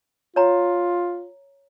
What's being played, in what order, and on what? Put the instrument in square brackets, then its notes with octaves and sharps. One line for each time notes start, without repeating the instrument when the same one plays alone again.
[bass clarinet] F4 [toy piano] C#5 A#5